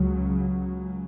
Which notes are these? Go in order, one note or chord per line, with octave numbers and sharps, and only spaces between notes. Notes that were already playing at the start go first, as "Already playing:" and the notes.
Already playing: C#2 C#3 F#3